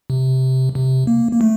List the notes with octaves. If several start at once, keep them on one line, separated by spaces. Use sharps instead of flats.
C3
C3
A#3
A#3
A3